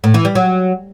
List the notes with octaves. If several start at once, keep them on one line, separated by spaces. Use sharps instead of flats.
A2
E3
G3
F#3